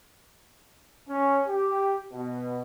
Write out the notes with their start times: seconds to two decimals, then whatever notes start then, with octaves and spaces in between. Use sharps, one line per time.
1.09 C#4
1.47 G4
2.11 B2